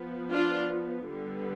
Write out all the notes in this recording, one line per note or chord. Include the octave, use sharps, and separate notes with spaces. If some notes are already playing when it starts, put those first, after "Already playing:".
Already playing: F3 B3
D4 F4
D3 G3 B3